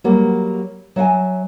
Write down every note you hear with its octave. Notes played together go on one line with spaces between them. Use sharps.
F#3 G3 A#3
F#3 E5 F#5 G#5